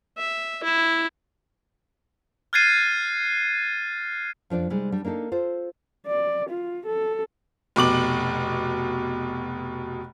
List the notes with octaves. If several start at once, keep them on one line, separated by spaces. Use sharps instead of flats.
E5
E4
F6 F#6 G#6 A6 C7 D#7
F2 F3 D4 D5
C3 G3 G#3 D#4
G3 D4
A#3 D4 D#4 A4
F4 A4 C5
D5
F4
A4
F1 B2 D6 F#7